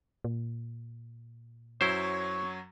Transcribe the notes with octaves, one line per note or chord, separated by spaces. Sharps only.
A#2
F#2 F#3 E4 C5 C#5 C#6